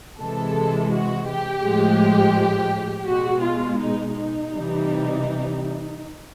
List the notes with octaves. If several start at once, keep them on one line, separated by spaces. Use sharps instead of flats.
C3 E3 G#3 A4
F#4
G4
A2 F3 G#3
B2 G#3 F#4
F4
D#4
D#4
C3 E3 G3